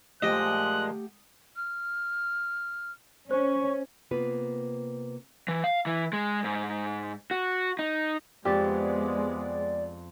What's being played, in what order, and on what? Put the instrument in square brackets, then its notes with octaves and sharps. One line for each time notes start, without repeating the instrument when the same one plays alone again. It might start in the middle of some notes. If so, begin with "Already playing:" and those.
[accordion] A#2 F3 G#3 [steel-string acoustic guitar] A3 G4 F#5 [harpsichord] D#5 [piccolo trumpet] F#6
[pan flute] F6
[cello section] C#4 [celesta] C5 [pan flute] C#6
[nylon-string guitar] C3 A#3 B3 F4 B4
[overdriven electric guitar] E3
F5
E3
G#3
G#2
F#4
D#4
[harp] F2 A6 [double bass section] G#3 B3 [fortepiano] G4 [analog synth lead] D5